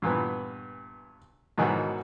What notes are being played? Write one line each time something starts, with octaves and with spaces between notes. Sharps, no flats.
G2 A#2 E3 B3
G#2 B2 D#3 E3 F#3 F#4